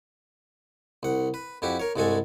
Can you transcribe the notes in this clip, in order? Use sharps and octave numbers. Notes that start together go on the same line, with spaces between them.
C2 F#5
B4
F2 E4 F#4 G4
A#4 C#5
C2 G2 G#3 F#4 A4 G#5